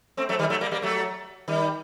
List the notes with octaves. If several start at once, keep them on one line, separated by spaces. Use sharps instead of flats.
A3 C4
F#3 A3
D#3 G3
F#3 A3
G3 A#3
G3 A#3
F#3 A3
D#3 G3